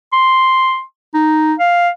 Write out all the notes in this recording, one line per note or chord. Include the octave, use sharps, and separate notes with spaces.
C6
D#4
F5